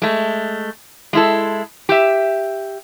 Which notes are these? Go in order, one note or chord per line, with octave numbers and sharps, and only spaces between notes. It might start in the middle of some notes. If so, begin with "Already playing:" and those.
G#3 A3
G#3 E4 A4
G4 E5